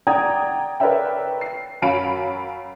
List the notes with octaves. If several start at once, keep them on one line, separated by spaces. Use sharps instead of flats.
D5 F#5 G5 A#5 D#6 G#6
A#4 B4 C#5 D5 E5 G5
C7
F#2 C#5 F5 B5 D7